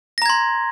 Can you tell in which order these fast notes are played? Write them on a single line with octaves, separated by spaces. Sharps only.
A#6 A#5 G#6 C6